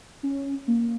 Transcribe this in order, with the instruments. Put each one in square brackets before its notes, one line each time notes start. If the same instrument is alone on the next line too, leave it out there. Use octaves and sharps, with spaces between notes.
[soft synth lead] C#4
A#3